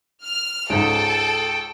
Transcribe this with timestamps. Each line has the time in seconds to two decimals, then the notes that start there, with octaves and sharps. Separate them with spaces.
0.24 F6
0.70 C#2 G#2 A4 G5